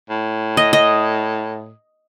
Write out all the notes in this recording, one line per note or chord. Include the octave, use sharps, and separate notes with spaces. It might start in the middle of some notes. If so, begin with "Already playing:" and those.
A2
D#5
D#5